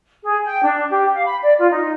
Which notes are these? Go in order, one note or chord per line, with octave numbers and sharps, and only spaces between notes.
G#4
G5
D4
G4
F5
B5
D5
F4
D#4